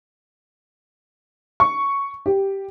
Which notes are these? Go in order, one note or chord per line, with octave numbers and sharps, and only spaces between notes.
C#6
G4